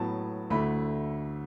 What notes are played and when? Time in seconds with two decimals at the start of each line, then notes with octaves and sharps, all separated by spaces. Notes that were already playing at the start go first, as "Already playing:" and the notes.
Already playing: A2 F#3 B3 A5
0.50 D2 D3 A3 E4 B5